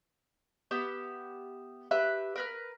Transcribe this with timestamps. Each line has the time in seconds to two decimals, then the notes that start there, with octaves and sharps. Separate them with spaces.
0.71 B3 G4 E5 D6
1.91 G4 B4 E5 F#6
2.36 A#4 B4 F6